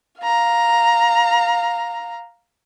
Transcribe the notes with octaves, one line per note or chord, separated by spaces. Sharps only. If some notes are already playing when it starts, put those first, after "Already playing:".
F5 A#5